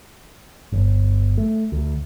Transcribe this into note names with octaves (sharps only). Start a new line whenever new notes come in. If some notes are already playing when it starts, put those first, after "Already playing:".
G1
A3
D2